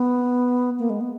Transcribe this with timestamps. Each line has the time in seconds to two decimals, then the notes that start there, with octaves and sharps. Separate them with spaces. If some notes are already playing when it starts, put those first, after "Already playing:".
Already playing: B3
0.79 A#3
0.90 G#3
1.01 B3